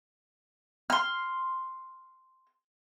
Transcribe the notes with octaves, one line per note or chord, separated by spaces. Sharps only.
C6 F6